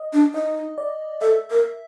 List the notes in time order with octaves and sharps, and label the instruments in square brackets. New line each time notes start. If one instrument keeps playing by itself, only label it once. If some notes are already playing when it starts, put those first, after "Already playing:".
Already playing: [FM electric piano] D#5
[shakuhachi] D4
[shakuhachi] D#4 [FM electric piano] D#5
[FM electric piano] D5
[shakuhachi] A4 [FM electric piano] E5
[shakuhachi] A#4